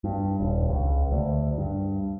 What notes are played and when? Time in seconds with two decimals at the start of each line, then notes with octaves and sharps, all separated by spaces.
0.04 G2
0.40 D#1
0.69 C#2
1.11 D2
1.58 G2